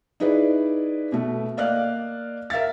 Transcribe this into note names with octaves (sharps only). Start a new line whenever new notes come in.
D#4 E4 G#4 B4 D5
B2 A3
A#3 D5 D#5 F5 F#6
A#4 E5 F5 A6